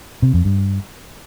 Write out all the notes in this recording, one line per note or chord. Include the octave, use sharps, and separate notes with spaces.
C3
F2
G2